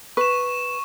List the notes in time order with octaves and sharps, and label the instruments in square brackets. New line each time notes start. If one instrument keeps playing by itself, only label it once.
[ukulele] B4 [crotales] C#6 E7